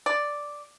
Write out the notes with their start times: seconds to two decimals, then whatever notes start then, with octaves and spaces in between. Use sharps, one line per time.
0.06 D5